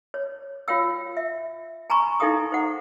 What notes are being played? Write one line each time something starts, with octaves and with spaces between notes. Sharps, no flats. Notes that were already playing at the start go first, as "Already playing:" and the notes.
C#5
F4 C#5 F5 G5 E6
E5
G#5 A#5 B5 C#6
D#4 E4 A4 F5 G5 D#6
C5 F#5